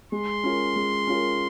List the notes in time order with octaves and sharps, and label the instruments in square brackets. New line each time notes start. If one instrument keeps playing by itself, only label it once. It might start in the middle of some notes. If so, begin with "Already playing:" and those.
[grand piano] G#3 [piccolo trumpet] C6
[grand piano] C#4 F4 A#4
G#3
C#4 F4 A#4